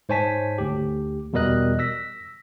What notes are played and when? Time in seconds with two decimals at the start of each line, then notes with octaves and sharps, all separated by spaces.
0.09 G#2 C5 C#5 G#5 A5 B6
0.58 D2 G4
1.33 E2 B2 G3 A#4 D#5 F#6
1.79 E6 A#6 B6